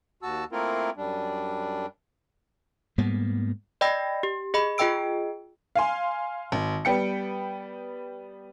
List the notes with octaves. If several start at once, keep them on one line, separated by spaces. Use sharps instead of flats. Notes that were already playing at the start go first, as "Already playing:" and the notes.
D#2 F#4 A5 E6
A3 A#3 C4 E4 F4 A#4
F#2 G3 D4
G#2 G3 A#3 B3
D5 D#5 G5 B5 E6 A#6
G4
G#4 D#5 B5
F4 G#4 D#5 G5 E6 D7
F5 G#5 C6
G#1
G3 B3 G5 C#7